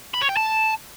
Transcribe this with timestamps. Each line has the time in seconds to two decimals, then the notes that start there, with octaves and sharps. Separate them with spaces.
0.14 B5
0.22 C#5
0.29 G5
0.37 A5